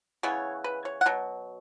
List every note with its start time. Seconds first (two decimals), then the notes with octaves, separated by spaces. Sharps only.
0.23 C#3 E3 B3 C#5
0.64 B4
0.85 C#5
1.01 F#5
1.06 B2 F#3